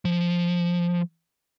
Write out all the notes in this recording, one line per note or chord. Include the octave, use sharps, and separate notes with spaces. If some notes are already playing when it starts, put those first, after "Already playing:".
F3